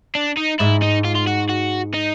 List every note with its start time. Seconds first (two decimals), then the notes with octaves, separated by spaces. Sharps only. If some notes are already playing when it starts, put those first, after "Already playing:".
0.15 D4
0.37 D#4
0.60 G#2 E4
0.82 D#4
1.05 F4
1.15 F4
1.27 F#4
1.49 F#4
1.94 D#4